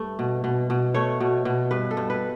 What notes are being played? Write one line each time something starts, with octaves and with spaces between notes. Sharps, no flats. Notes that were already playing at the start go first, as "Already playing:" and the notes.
Already playing: G2 A3
B2
B2
B2
A3 C#5
B2
B2
G2 B4
A4
G2
B4